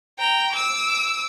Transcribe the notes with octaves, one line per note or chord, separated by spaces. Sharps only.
G5 A#5
D6 E6